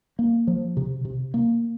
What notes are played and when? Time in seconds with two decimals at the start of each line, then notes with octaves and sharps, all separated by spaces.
0.19 A#3
0.47 F3
0.77 C3
1.05 C3
1.34 A#3